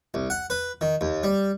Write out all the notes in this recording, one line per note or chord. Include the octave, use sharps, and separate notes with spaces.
C2
F#5
B4
D#3
D#2
G3